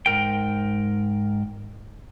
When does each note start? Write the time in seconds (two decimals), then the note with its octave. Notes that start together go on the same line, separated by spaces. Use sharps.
0.06 G#2 A#4 G5